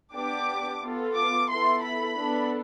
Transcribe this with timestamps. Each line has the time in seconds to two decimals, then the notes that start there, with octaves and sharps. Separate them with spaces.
0.13 B3 D4 G4 D6
0.81 B3 F4 A4
1.15 D6
1.49 B3 E4 A4 C6
1.83 B5
2.17 B3 D4 A4